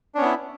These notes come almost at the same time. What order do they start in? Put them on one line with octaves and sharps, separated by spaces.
D4 C#4 B3 E4